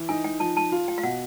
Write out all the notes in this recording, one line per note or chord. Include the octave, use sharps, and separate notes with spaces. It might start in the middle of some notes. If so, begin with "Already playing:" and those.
Already playing: E3
D#4 G#5
G5
F3 A5
A5
F4
G5
F5
B2 F#5